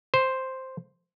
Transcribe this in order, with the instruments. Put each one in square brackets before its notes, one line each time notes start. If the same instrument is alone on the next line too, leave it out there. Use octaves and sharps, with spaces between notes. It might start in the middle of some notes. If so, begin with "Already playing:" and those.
[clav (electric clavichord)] C5